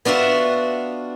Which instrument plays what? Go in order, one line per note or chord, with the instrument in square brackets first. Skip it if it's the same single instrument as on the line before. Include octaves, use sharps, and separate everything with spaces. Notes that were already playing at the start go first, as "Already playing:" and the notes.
[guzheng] B3 D4 F4 F#4 E5